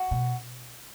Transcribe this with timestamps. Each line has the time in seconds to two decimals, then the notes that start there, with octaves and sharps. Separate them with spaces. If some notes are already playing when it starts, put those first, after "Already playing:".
Already playing: F#4
0.11 B2